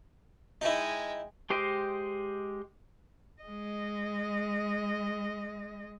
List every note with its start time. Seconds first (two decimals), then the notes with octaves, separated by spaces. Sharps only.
0.61 G#3 D#4 E4 G5
1.50 G#3 G4 C5 D#5 G5
3.43 G#3 D#5